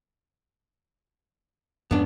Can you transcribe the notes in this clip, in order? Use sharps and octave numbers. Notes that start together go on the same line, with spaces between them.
F2 G#2 B3 C#4 D4